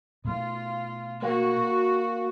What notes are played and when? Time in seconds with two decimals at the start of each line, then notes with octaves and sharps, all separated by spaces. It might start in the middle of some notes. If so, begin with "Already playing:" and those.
0.25 B2 A3 F4
1.22 A#3 F#4